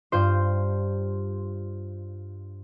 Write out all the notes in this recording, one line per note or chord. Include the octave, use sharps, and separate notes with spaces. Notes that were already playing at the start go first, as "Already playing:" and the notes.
G2 F4 C5